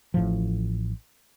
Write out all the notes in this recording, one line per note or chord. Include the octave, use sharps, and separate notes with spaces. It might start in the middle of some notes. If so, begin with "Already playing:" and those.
A1 A2 F3